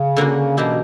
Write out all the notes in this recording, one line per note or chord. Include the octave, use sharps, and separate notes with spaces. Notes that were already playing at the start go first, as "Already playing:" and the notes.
Already playing: C#3
D3 A#3 C#4 F#4
B2 E3 A#3 E4 G4